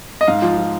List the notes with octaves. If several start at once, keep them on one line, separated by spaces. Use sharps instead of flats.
D#5
G#2 F5
F3
F3